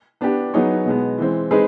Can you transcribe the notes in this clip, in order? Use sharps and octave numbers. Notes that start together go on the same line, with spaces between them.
B3 D4 G4
F#3 B3 D#4 G#4 C#5
B2 G#3 B3
E3 G#3 C4
G#3 C4 D#4 G#4 B4